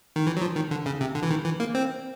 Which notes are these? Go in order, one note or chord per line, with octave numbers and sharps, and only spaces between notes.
D#3
E3
F#3
F3
D#3
D3
C#3
C3
D3
E3
D#3
E3
A#3
C4